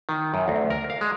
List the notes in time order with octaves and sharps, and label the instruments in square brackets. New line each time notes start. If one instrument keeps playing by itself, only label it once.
[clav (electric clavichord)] D#3
F#2
D2
A#4
F5
G#3